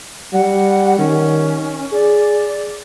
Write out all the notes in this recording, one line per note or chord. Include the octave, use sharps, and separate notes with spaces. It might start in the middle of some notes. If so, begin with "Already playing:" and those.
G3 F#5
D#3 C#4
G#4 D5